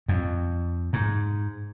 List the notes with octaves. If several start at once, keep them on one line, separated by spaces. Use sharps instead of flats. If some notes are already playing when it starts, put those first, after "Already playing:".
F2
G#2